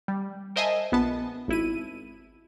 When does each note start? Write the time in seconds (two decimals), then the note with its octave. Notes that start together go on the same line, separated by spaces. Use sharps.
0.08 G3
0.56 A#4 C5 D#5 E5 G#5 A5
0.92 A#1 B3 A5
1.48 G#1 E4 D#7